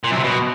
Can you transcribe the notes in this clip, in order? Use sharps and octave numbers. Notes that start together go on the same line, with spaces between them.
A#2
F#2
C3
B2